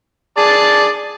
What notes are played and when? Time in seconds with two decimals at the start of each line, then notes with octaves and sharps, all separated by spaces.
0.37 G#4 D5 A5